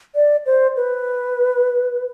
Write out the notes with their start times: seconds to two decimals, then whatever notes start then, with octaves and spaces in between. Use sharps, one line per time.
0.15 D5
0.46 C5
0.76 B4